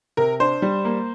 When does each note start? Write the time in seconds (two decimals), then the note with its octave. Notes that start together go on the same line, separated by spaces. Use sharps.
0.17 C3 A#4
0.40 D4 C5
0.62 G3
0.85 A#3